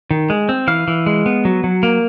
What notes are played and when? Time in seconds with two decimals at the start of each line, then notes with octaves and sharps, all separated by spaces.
0.11 D#3
0.30 G#3
0.49 C4
0.67 E3 F5
0.88 E3
1.06 G#3
1.26 B3
1.45 F#3
1.64 F#3
1.83 A#3